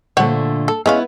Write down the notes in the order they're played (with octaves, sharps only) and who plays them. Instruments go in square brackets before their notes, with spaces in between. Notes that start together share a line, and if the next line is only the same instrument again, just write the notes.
[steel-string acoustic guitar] A#2 D3 A3 [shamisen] C5 C#5 F#5
[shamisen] A4
[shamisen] G#3 C#4 F5 [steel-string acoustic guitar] B3 E4